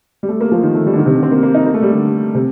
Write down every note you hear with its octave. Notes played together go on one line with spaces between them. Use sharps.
G3
A3
A#3
F3
D#3
A3
G3
D3
D#3
C3
D3
C4
A#3
A#3
D#4
A#3
A3
G3
D3
C3